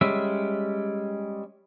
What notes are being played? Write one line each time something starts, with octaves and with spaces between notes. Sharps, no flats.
G3 G#3 C#4 E5